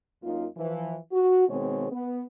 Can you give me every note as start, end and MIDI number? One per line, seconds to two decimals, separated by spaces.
0.23 0.46 42
0.23 0.46 58
0.23 0.46 63
0.23 0.46 65
0.57 0.97 52
0.57 0.97 53
1.13 1.47 66
1.49 1.87 47
1.49 1.87 51
1.49 1.87 56
1.49 1.87 60
1.49 1.87 68
1.49 1.87 73
1.92 2.23 59